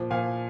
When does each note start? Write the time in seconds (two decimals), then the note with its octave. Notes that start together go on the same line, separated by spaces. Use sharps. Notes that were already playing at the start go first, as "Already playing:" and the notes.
Already playing: A#2 F3
0.10 A#2 F3 F5 G#5